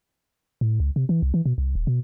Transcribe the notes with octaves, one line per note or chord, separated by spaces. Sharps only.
A2
C#2
C3
E3
C2
E3
B2
C2
D#1
B2